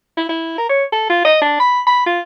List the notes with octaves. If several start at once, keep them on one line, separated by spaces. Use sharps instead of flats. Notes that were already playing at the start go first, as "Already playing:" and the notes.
E4
E4
A#4
C#5
A4
F4
D#5
D4
B5
B5
F4